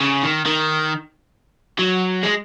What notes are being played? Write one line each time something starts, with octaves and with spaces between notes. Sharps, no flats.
C#3
D#3
D#3
F#3
G#3